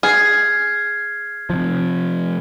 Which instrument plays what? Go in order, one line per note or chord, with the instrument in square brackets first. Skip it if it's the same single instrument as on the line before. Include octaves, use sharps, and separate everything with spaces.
[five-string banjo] G#4 [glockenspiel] F6 G#6 C7
[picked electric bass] C3 F3